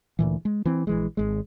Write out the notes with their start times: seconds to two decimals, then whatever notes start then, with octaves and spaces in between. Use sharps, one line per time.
0.19 D2 A#2 E3
0.45 G#3
0.65 E3 C4
0.87 A#1 E3 G#3
1.17 G#1 G#3